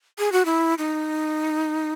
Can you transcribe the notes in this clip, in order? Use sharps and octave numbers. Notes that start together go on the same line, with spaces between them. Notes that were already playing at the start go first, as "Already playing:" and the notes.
G#4
F#4
E4
D#4